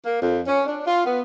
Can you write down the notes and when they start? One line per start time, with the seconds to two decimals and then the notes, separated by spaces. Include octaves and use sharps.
0.05 A#3
0.21 F2
0.47 C#4
0.66 D4
0.86 F4
1.06 B3